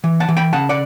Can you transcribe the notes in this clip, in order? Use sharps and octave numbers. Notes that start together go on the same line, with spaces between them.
E3
F#5 A5
E3
G5 B5
C#3 F#5 A5
D5 F#5